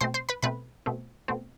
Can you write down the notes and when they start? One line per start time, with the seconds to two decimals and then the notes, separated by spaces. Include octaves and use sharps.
0.01 B2 A3 C4 C5 C6
0.14 C5 C6
0.29 B4 B5
0.42 B2 A3 C4 B4 B5
0.86 B2 A3 C4
1.28 B2 A3 C4